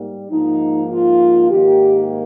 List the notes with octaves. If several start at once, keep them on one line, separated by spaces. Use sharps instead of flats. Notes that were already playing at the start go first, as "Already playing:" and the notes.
Already playing: G#2 G3 A#3
G#2 F3 A#3 D#4
F4
G#2 D#3 A#3 G4